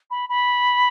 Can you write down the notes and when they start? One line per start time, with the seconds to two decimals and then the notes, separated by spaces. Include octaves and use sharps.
0.10 B5
0.29 B5